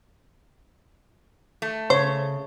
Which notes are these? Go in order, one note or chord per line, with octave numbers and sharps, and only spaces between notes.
A3
C#3 C5 C#5